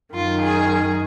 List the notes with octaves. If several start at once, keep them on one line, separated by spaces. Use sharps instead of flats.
F#2 D#3 F4
G#4